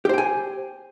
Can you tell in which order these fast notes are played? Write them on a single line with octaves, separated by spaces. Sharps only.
G4 C5 G5 G#5